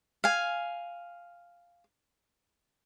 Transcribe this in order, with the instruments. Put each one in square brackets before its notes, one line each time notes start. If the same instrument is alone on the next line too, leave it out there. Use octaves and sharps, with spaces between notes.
[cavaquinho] F5 G#5